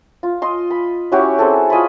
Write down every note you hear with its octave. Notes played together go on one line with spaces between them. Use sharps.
F4
D#5 C6
B5
C#4 E4 F#4 G4
C4 G#4 A4
F4 D#5 G#5 B5